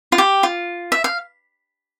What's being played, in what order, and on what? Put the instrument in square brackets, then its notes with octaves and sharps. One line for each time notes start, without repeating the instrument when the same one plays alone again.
[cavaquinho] F4
G4
F4
E5
F5